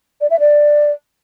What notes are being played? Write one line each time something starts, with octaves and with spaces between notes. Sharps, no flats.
D5
E5
D5